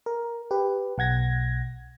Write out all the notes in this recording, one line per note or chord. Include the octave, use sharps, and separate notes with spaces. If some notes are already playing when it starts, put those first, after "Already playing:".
A#4
G4 B4
B1 F#5 G#6 A#6